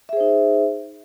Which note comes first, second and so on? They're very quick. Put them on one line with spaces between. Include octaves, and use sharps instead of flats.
E5 G#4 C5 D#4